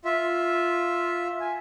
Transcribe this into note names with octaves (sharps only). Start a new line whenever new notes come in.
F4 E5
G#5